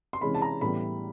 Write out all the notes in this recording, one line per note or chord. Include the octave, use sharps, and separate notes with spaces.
C6
C3 E3 G#3 C#4 B5
A5
A#5
A2 E3 G3 B3 B5